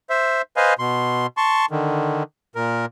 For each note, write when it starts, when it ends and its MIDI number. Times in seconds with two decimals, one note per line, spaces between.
0.10 0.42 72
0.10 0.42 76
0.57 0.74 71
0.57 0.74 72
0.57 0.74 75
0.57 0.74 77
0.57 0.74 80
0.79 1.27 47
0.79 1.27 84
1.37 1.66 81
1.37 1.66 84
1.37 1.66 85
1.71 2.23 50
1.71 2.23 51
2.56 2.86 46
2.56 2.86 70